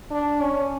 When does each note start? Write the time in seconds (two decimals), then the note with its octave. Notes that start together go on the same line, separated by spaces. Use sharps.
0.11 D4
0.41 C#4